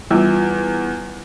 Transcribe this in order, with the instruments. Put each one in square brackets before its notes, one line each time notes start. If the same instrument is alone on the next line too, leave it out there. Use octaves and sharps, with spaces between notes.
[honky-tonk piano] E2 [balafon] G3 F4